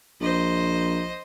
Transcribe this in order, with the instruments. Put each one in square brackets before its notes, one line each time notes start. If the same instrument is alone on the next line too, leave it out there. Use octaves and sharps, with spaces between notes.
[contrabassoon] A#1 [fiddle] C5 D#5